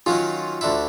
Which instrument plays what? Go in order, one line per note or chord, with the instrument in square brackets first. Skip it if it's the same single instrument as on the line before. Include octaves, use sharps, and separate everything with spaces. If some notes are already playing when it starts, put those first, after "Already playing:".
[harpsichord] D#3 F#3 C#4 [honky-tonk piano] F4
[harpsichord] D2 D3 E4